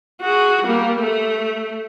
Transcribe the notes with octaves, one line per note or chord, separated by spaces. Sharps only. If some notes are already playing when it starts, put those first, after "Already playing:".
F#4 G#4
G3 A#3
A3